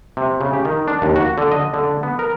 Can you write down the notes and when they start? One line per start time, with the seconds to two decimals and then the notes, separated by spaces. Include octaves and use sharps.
0.17 C3
0.41 C#3
0.53 G4
0.65 D#3
0.88 D4
1.02 D#2
1.16 F#4
1.38 D3
1.52 D#5
1.74 D3
2.03 B3
2.19 A#4